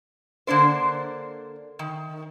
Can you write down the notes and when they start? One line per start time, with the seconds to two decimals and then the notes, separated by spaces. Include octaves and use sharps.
0.47 D3 A#3 D4 C5
1.79 D#3